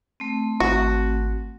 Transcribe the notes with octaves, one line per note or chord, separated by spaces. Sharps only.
A3 C4
G#1 F#4